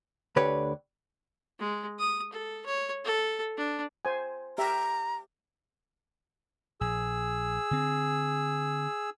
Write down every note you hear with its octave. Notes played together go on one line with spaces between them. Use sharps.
D2 D3 G4 B4 C#5 D5
G#3
D#6
A4
C#5
A4
D4
C5 G#5
G4 E5 A#5
A#1 G#4 E6
D3 C4